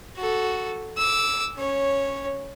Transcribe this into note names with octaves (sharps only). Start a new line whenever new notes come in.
F#4 A4
D6 E6
C#4 C#5